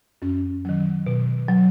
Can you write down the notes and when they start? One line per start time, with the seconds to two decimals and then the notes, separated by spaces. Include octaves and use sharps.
0.22 F#2 C#4
0.65 D#3 F#3
1.07 B2
1.48 F#3